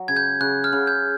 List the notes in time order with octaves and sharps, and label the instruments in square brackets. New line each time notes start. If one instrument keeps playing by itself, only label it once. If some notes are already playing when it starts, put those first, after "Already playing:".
Already playing: [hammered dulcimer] F#3
[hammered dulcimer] C#3 [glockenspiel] G#6
[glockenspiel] G6
[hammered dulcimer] C#3 [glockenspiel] F#6
[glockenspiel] F6
[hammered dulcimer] C#3
[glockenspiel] G6